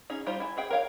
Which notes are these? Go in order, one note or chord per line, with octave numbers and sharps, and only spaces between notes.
C#4 D#4 G#4
G3 D#4 F4 C5
E4 G#5
B3 G#4 G5
A#4 C#5 F5 G5